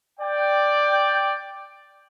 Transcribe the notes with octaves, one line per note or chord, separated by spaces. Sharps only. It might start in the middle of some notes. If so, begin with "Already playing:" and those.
D5 G5